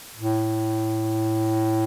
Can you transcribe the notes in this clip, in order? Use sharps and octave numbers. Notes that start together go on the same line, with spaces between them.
A2